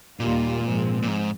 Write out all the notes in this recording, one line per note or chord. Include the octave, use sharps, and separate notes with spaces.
D#2 A#2 D#3 G3 A#3 F4
G#2 F3 G#3 C4
A#2
G#2